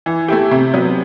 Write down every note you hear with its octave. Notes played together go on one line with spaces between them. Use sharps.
E3
A3 E4 G4
C3
F#3 B3